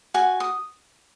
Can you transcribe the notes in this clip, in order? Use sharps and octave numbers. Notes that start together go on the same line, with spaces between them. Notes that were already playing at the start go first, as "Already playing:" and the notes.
F#4 G#5
D#6